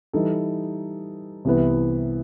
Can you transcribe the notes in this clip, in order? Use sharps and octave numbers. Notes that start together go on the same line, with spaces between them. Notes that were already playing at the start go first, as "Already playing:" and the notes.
E3 G3 D#4 A4
C2 C3 E3 B3 E4